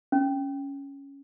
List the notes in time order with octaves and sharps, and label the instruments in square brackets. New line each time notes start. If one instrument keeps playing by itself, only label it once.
[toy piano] C#4